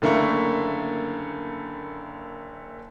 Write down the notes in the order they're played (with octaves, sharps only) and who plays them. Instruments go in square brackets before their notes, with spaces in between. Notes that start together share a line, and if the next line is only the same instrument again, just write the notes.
[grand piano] F#1 D3 A3 A#3 E4 C#6